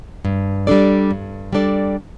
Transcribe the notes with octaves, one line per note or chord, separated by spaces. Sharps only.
G2
G3 D4 A4 D5
G2
G3 D4 A4 D5